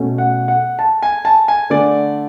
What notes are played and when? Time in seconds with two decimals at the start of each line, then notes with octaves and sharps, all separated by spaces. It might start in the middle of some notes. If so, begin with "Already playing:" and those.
Already playing: B2 A3 C#4
0.18 F#5
0.48 F#5
0.79 A5
1.03 G#5
1.25 A5
1.48 G#5
1.70 D3 A3 D4 D5